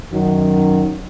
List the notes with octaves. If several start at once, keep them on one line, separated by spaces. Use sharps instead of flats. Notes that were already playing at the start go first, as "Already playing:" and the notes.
F#2 D#3 F#3